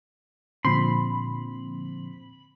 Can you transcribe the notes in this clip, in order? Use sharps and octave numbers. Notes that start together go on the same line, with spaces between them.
A#2 D3 F3 C4 B5 C6